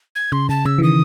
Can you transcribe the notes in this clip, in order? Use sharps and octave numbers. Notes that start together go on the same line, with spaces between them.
G#6
C#3 C6
C#3 A5
C#3 E6
E3
D#3 D#6